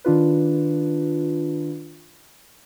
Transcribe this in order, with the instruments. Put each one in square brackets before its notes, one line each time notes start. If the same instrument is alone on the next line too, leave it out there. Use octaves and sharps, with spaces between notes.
[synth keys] D#3 D4 F4 B4